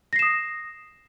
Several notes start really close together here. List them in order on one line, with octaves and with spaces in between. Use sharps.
A#6 C7 E7 D#6